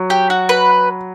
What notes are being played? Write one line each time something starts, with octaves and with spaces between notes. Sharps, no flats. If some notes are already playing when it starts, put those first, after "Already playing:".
Already playing: F#3
G4
F#4
B4